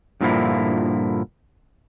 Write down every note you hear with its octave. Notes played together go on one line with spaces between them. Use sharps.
G2 A#2 D3 F3 A#3 E4